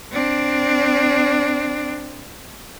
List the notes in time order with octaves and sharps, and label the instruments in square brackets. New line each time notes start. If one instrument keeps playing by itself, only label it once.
[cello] C4 D4